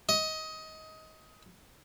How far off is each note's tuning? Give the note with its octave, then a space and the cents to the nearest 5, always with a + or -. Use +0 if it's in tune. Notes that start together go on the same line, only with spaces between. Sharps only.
D#5 +20